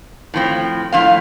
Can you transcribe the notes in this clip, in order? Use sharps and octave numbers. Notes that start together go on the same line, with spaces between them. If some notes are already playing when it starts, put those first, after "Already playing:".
A2 F3 C4
A2 F3 C4 F5